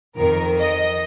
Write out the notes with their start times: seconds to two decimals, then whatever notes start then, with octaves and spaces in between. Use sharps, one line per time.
0.16 F2 D#3 A#4
0.58 D#5